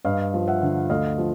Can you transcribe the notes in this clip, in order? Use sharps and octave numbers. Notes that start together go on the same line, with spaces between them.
G2 D#5 F5
F3
E5 F#5
D3
D2 D#5 F5
F3